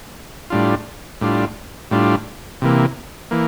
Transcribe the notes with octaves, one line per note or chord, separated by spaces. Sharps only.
A2 G3 D4 F4
A2 G3 D4 F4
A2 G3 D4 F4
C3 E3 A#3
E3 A#3